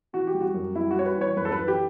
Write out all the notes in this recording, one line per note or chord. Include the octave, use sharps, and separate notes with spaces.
E3 F#4
G4
G3
F#4
F#2
G3 E4
F#4
G3 C#5
B4
E3
C#5
F#2 B4
A4
B4
E3
G4